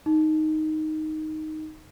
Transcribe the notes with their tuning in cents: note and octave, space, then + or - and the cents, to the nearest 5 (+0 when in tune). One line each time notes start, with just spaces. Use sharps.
D#4 +0